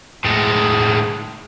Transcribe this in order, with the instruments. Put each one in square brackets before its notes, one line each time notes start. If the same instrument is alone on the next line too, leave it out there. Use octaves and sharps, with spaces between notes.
[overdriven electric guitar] A2 G#3